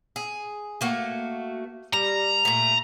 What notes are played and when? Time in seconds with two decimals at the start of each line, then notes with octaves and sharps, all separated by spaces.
0.16 G#4
0.81 A3 A#3 F#4
1.93 G3 A#5
2.45 A#2 A3